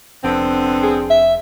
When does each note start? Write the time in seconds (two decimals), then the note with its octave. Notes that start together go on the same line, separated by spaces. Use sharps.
0.24 F1 D3 B3 C4
0.83 G#4
1.10 E5